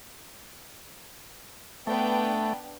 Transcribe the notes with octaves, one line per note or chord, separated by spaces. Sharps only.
A3 B3 D4 G5